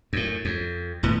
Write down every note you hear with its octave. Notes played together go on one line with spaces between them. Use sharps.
F#2 A2
F2
D#1 A2 B3